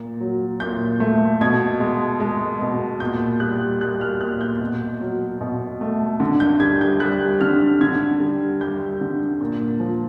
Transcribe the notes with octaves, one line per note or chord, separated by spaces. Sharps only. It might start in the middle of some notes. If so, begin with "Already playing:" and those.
Already playing: A#2
F#3
A#2 G6
A3
B2 G#6
G#3
G#3
B2
A#2 G6
G3 F#6
G3 F#6
F6
A#2 F#6
G6
B2
F#3
B2
A3
D3
G6
G3 G#6
G6
G3 F#6
D3 F6
D3 G#6
G3
G3 G6
D3
A#2
F3